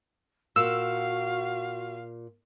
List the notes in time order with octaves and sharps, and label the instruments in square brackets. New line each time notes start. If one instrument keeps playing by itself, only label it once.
[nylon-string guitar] A#2 [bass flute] F#4 [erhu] F5 [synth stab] E6